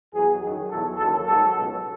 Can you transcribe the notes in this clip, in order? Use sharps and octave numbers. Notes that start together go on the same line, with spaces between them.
E2 B2 F#3 G#4
F#2 D#3 F#3
E2 B2 F#3 A4
D#2 C#3 F#3 A4
G#2 F#3 A4
C#2 B2 F#3